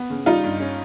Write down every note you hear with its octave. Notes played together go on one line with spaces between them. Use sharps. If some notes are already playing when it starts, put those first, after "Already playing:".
Already playing: B3
C#3
G3 D#4 F4
G2
C#4